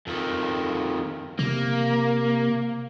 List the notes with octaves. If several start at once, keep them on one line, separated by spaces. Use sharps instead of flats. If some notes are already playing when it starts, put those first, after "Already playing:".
F2 D#3
C3 A#3